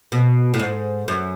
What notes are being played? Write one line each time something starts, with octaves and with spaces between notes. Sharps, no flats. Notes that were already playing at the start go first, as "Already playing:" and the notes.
B2
A2
G#2
F#2